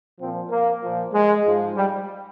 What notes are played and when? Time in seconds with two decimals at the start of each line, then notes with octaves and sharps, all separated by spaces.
0.19 A#2 F3 C4
0.50 A#3
0.81 A#2 F3
1.12 G#3
1.44 G#2 F3
1.75 G3